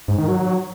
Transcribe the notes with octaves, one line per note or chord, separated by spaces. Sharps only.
G#2
D#3
F#3